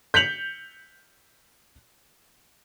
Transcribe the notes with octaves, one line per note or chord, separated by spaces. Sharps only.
G6 B6 C#7 F7 F#7